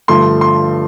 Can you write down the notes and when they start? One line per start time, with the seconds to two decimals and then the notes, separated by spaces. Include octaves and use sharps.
0.08 G2 D3 F3 A3 C6
0.41 C6